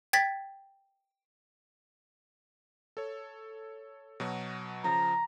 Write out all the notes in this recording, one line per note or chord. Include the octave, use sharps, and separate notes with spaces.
G5 G#6 A6 B6
A4 C#5
B2 F#3 F#4
C#3 F3 A#5